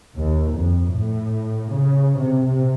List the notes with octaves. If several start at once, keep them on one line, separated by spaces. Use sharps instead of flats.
D#2
F2
A2
C#3
C3
C3